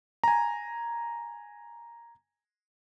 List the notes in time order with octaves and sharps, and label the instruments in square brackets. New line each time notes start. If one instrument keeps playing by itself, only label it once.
[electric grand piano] G#5 A#5